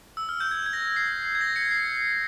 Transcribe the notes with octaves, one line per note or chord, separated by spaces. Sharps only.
E6
F6
G6
G#6
G#6
A#6
C7
G#6
A#6
C#7
C7